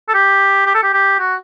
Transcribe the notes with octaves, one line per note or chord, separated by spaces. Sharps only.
A4
G4
G4
A4
G4
G4
F#4